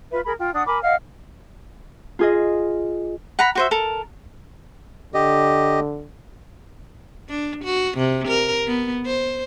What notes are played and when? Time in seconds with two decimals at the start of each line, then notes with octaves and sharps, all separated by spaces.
0.11 F4 B4 E5
0.25 G#4 A#4 B5
0.39 F4 G5
0.54 D4 F#5 D#6
0.67 A#4 G#5 B5 D6
0.83 D#5 F5 F#5 F6
2.19 F4 G#4 D#5
3.39 F#5 A#5 B5
3.55 F#4 C5 E5
3.71 A4 A#4
5.14 D3 G4 D#5
7.29 D4
7.64 F#4
7.98 C3
8.28 A#4
8.67 B3
9.06 C5